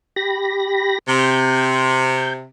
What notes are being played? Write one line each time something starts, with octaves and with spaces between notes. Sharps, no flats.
G4 B5 A#6
C3 G6